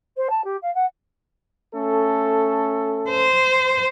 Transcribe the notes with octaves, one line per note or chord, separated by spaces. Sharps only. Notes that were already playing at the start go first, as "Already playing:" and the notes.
C5
A5
G4
F5
F#5
A3 C#4 A4
C5